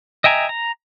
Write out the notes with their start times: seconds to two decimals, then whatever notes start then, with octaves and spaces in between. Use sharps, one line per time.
0.24 D#5 E5 G5 G#5 A#5
0.49 A#5